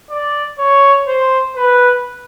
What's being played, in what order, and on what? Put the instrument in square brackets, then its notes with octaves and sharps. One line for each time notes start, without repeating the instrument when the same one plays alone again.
[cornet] D5
C#5
C5
B4